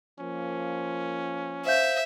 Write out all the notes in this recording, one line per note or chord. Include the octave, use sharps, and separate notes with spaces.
F3 A#3 C#4
C5 E5 F5 G6